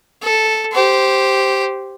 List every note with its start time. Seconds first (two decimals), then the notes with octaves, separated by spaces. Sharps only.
0.22 A4
0.72 G4 C5